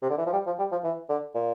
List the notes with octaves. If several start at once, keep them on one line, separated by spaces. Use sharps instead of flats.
C3
D3
E3
F3
G3
F3
G3
F3
E3
D3
A#2